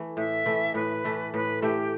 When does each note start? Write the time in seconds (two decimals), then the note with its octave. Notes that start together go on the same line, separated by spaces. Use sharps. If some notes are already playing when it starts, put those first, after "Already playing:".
Already playing: E3 A3
0.17 A2 E5
0.46 E3 A3
0.75 A2 B4
1.04 E3 A3
1.34 A2 B4
1.62 E3 A3 G4